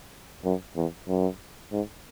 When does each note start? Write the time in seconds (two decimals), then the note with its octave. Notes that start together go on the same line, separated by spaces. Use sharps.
0.44 F#2
0.76 E2
1.08 F#2
1.72 G#2